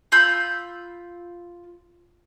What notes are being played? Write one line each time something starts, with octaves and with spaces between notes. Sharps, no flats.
F4 B5 E6 G6